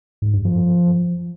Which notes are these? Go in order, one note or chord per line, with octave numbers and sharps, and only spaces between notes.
G#2
G2
F3